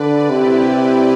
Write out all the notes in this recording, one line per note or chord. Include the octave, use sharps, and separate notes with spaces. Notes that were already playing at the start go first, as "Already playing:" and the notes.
Already playing: D3 B4 D5
C3 E4 G4